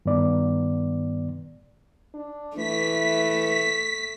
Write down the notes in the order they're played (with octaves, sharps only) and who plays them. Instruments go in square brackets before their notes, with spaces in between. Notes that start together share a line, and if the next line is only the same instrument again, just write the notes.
[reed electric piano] G2 D#3 B3 D5
[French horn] D4
[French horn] E3 [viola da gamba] A3 [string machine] B6